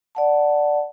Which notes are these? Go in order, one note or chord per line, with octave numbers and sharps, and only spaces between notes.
D5 F#5 A5